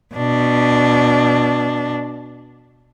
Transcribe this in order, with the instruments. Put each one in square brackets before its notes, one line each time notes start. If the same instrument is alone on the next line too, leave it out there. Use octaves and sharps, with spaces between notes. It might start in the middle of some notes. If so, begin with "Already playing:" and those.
[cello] B2 D4